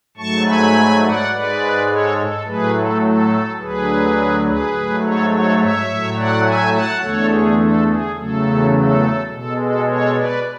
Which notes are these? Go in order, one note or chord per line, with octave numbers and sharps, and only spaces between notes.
G#2 F#3 A3 A5 C#6
G#5 B5
D5 F#5
G#2 G#3 B4 D5
A4 C#5
A4
A2 F#3 A3 G#4 B4
A4
A4
D2 D3 F#3 G#4 B4
G#4 B4
G#2 F#3 A3
A4 C#5
A4 C#5
C#5 E5
A2 F#3 A3
D5 F#5
E5 G#5
F#5 A5
E2 D3 A3 A4 C#5
G#4
A4
G#4
E2 C#3 F#3 A3 A4
A4
B2 G#3 A4
A4
A4 C#5
B4 D5